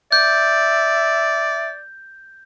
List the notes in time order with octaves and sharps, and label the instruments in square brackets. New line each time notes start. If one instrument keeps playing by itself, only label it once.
[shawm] D5 [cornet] E5 [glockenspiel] G6